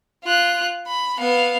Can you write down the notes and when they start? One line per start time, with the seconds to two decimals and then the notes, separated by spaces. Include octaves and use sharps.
0.24 F4 F#6
0.87 B5
1.18 B3 F5